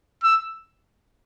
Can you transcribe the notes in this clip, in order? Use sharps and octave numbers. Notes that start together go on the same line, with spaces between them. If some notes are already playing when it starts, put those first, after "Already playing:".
E6